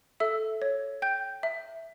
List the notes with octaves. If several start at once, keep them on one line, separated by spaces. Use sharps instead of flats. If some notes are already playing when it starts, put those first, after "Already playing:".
A4 E5 E6
C#5
G5 G6
E5